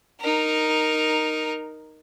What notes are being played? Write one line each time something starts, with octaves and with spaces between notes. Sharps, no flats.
D#4 A#4